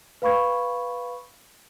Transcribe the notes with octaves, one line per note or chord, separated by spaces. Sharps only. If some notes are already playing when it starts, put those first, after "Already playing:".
B4 F5 B5 C#6 G#6